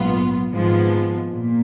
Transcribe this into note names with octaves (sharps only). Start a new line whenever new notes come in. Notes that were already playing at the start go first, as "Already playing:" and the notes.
Already playing: A#1 G#2 F#3 B3 F4
G#1 G#2 F3 G#3 B3
A#2